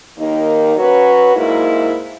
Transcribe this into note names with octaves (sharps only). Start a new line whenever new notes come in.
D#2 D#3 A#3 D#4
F#3 C#4 F#4 B4
G#2 F#3 A#3 E4